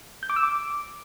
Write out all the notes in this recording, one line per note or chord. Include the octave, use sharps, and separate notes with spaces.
G6
D6
E6
D6